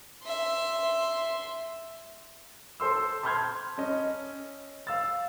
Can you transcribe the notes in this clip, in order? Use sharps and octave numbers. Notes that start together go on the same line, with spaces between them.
E5 C6
A4 C5 C6 E6
A5 B5 C6 F6 G6 G#6
C#4 D#5
F5 E6 A6